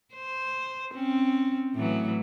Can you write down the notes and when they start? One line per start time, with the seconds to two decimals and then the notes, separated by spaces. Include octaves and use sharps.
0.14 C5
0.95 C4 C#4
1.74 A2 E3 F#3